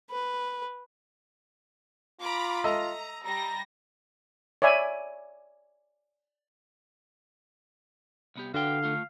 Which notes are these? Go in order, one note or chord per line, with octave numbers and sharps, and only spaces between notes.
B4
F4 A#5 B5 D6
A4 D#5 E5 A#5
G3 A#5 A#6
C#5 D5 E5 G#5 B5
C2 B3 G4
D3 F#4 B4 F5 G5
A3 F4